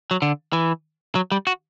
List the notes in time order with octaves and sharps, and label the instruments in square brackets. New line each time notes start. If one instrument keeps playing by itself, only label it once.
[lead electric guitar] F#3
D3
E3
F#3
G3
F#4